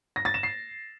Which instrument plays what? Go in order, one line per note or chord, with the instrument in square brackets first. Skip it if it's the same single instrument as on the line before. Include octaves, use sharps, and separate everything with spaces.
[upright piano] A#6
A6
E7
C7